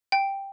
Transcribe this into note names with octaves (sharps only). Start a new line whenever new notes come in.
G5